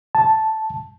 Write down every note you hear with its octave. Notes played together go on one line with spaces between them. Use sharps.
A5